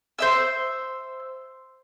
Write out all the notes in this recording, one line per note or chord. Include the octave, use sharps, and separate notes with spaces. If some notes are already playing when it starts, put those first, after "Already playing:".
C5 E5 E6